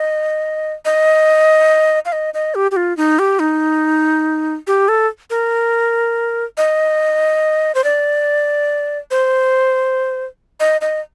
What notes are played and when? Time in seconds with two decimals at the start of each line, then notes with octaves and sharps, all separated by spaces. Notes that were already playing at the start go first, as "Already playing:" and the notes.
Already playing: D#5
0.85 D#5
2.06 F5
2.12 D#5
2.34 D#5
2.55 G4
2.71 G4
2.76 F4
2.97 D#4
3.19 G4
3.39 D#4
4.67 G4
4.88 A4
5.30 A#4
6.57 D#5
7.75 C5
7.84 D5
9.11 C5
10.60 D#5
10.81 D#5